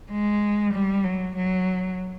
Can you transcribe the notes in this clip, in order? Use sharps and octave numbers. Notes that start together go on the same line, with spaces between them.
G#3
G3
F#3
F#3